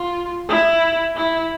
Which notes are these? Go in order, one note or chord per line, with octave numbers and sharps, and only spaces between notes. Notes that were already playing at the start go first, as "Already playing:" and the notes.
Already playing: F4
E4
E4